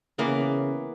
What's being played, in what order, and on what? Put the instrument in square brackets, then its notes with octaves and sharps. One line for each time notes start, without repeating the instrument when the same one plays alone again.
[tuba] C#3 [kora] E3 A#3 B3